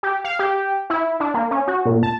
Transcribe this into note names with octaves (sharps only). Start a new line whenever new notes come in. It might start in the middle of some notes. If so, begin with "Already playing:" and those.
G4
F5
G4
E4
D4
A#3
C#4
F#4
A#2
A5